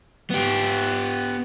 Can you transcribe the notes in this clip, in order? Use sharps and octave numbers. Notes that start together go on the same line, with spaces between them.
B3 G4